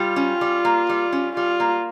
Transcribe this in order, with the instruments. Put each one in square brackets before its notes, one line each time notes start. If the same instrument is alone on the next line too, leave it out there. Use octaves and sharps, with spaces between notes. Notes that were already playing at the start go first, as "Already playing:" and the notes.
Already playing: [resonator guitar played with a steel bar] G3 [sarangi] F4
[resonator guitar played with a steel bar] C#4
G3
A#3
G3
C#4
[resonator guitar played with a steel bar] G3 [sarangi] F4
[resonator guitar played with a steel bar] A#3